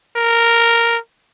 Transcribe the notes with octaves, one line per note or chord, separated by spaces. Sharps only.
A#4